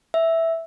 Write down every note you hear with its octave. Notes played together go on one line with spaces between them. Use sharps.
E5